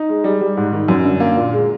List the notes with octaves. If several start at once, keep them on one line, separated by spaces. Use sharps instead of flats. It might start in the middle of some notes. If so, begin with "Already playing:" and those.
Already playing: D#4
G#3
G3
G3
G#2
D#3
F#2
D3
A#3
A#2
G#3